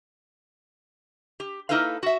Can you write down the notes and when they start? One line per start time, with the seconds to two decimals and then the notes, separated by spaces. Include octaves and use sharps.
1.40 G4
1.69 A#3 D#4 E4 A4 B4 F5
2.03 F#4 E5